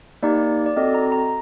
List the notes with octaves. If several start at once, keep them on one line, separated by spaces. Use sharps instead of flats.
A#3 D#4 G4 D5
D5
C4 F#4 A4 D#5
A#5
A#5